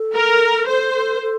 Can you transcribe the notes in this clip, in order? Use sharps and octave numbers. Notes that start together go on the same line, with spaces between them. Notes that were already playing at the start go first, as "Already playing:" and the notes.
Already playing: A4
A#4
A4 C5
A4
A#4
A4